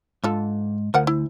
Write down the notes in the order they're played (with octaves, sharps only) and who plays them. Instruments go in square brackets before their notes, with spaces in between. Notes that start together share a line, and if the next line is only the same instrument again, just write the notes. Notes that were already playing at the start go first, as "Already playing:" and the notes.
[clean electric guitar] G#2 [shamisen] D3 F4 A4
[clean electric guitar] D2 [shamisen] F3 A#4 F#5
[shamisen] E4